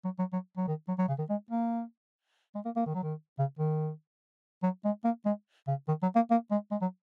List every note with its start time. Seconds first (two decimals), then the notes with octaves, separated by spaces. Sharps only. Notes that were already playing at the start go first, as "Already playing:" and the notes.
0.05 F#3
0.19 F#3
0.33 F#3
0.57 F#3
0.67 D#3
0.88 F#3
0.98 F#3
1.08 C#3
1.19 D#3
1.29 G#3
1.50 A#3
2.55 G#3
2.65 A#3
2.76 A#3
2.86 D#3
2.95 F#3
3.03 D#3
3.39 C#3
3.59 D#3
4.63 F#3
4.85 G#3
5.04 A#3
5.26 G#3
5.67 C#3
5.88 D#3
6.02 F#3
6.16 A#3
6.31 A#3
6.51 G#3
6.71 G#3
6.82 F#3